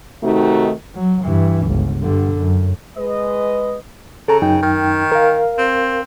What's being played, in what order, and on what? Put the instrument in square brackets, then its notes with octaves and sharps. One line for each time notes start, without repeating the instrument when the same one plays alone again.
[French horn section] C3 D#3 A3 D#4 F#4
[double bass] F#3
G2 E3
G1 C#2
G2 D3
F#2
[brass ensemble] G#3 B4 D#5
[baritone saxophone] C#3 [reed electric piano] A4 A#5
[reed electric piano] F#2 D#4 G5
[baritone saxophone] D#3
[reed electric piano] A#4 F5
[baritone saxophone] C4